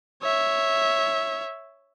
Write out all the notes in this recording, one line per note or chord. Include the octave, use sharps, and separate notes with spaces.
C#5 E5